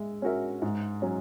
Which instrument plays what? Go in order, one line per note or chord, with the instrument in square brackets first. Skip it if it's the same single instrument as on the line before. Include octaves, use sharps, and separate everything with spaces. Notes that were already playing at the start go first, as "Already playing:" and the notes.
Already playing: [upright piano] G#3 E5
C#4 F#4 A#4 E5
G#2
F#3 C#4